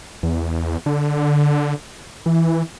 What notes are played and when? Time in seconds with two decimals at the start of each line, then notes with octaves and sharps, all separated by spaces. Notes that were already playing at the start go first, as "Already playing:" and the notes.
0.23 E2
0.86 D3
2.26 E3